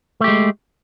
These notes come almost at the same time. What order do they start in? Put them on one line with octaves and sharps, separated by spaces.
A3 G4 G#3